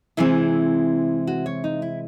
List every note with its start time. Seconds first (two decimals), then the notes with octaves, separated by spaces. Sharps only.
0.17 C3 E3 G#3 C4 E4
1.27 F#4
1.46 C#5
1.64 D#4
1.82 E4